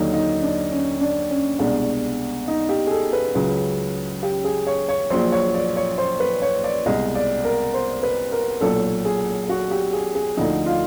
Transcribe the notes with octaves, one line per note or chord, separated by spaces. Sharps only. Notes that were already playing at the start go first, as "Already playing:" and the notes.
Already playing: D#2 D3 F#3 D#4
D#4
D4
C#4
D4
C#4
C2 B2 G#3 D4
D#4
G4
G#4
A4
B4
C#2 C#3 F#3
G4
G#4
C#5
C#5
A#1 A#2 F#3 C5
C#5
D5
C#5
C5
B4
C#5
D5
C2 B2 G#3 D#5
D5
A#4
C5
B4
A#4
B1 A#2 F#3 A4
G#4
F#4
G4
G#4
G#4
D2 D3 F3 D#4
F4